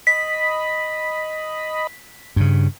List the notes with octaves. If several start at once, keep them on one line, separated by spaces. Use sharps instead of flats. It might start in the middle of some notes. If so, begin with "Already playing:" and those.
D#5 B5 B6
G2 C#3